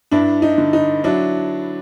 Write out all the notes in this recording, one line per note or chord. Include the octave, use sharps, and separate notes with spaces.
G2 D4 E4
D#4
D3
D#4
F#3 D4 E4